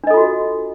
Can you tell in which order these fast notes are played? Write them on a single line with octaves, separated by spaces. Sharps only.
D4 D#5 A4 F4 F#4